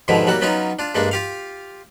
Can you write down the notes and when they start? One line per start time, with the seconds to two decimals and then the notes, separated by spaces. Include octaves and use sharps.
0.08 G#2 B2 D3 D#3 F3 E4
0.27 F#3 G3 A#3 F#4
0.41 F#3 B3 C#4 D#4 F4
0.79 D4 F4
0.95 G2 G#3 A#3 D4
1.11 F4 G4 F5